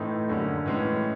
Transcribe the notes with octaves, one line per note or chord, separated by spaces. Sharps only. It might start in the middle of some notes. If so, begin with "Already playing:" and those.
Already playing: A2 E3 A3 C4 D#4
F#2 D3 G3 A#3 C#4
A2 E3 G#3 C#4